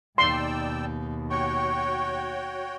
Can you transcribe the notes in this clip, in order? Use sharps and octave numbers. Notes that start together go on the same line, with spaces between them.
D#2 B2 D#4 D5 G5 C6 E6
F#4 C#5 G5 C#6